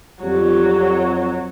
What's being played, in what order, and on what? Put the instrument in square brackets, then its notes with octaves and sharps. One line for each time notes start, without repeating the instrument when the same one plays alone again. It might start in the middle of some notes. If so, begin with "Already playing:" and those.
[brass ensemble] F2 [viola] F#3 [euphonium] G3